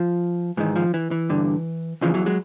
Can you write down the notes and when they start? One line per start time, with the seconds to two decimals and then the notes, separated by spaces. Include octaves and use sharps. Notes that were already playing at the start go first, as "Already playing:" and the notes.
Already playing: F3
0.57 G#2 D#3 E3
0.76 F3
0.94 E3
1.11 E3
1.29 G2 D3
2.01 E2 C#3 E3 F3
2.14 E3 F#3
2.26 F#3 G#3